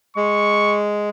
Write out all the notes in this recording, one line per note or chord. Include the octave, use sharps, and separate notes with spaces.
G#3 C#6